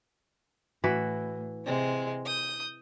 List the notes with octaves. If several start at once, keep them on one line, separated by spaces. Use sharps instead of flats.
A2 E3 E4 F#4
C3 G#3 C4
D#6 G6